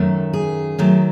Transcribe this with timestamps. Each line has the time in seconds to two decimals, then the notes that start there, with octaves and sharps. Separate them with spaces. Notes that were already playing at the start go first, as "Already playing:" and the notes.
Already playing: F#2 D#3 A3
0.33 G#4
0.78 D#3 F#3 A3